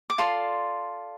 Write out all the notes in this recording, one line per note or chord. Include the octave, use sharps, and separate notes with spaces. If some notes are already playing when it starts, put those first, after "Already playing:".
D6
F4 A4 D5 C6